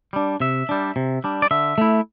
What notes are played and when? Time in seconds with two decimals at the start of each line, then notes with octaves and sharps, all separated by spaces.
0.13 G3 D4
0.40 C3 E5
0.69 G3 D4
0.96 C3
1.24 G3 D4
1.42 D5
1.51 D3 E5
1.78 A3 E4